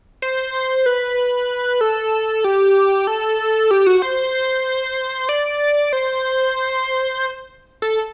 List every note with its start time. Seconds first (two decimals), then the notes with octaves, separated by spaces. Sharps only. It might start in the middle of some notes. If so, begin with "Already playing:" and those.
0.22 C5
0.86 B4
1.81 A4
2.44 G4
3.07 A4
3.71 G4
3.87 F#4
4.02 C5
5.29 D5
5.93 C5
7.82 A4